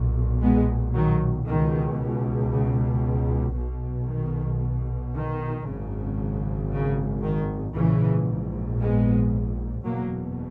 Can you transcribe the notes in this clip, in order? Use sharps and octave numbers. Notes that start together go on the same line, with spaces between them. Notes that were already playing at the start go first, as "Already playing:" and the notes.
Already playing: B1 A#2
G#3 B3
D#3 F#3
C#2 B2 D#3
C#3
B1 B2
D#3
D#3
G#1 F#2 C#3
C#3
D#3
A#1 G#2 C#3 E3
G#3 B3
F#1 E2 B2 F#3 A#3